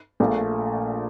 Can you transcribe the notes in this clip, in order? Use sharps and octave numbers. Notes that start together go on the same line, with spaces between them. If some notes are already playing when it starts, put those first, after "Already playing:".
A#1 A#2 A3